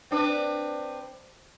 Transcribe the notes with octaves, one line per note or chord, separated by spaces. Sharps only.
C4 D4 B4